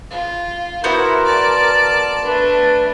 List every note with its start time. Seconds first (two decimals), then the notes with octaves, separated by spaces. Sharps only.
0.11 F4
0.84 B3 E4 F#4 A#4 C5
1.26 D5 A5
2.25 A3 D4 B4